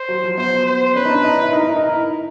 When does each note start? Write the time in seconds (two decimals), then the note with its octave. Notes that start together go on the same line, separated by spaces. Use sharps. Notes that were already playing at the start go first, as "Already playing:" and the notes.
Already playing: C5
0.09 F#3
0.23 F3
0.37 B3 C5
0.66 C5
0.95 C#4 B4
1.05 D#4
1.10 D4
1.24 D#4
1.38 E4
1.52 D#4 A#4
1.64 E4
1.76 D#4